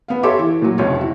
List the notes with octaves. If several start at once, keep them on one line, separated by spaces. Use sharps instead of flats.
B3 F5
G4 A4 C#5 E5 C6 D6
E3
A#2 F#3
F1 C#2 C#5
E4 F#4